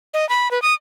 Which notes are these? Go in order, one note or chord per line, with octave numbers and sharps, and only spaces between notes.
D#5
B5
B4
D#6